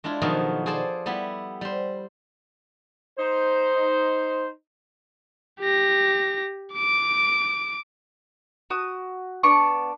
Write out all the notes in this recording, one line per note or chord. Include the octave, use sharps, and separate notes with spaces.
G#3 D4 E4 F4
B2 D#3 F3 F#3 G#4 A4
G#4 A4 C5 D5 A5
G3 B3 E4
G3 C5
D#4 C5
G4 A#6
D6 D7
F#4 D#6
B3 D4 C#6 D6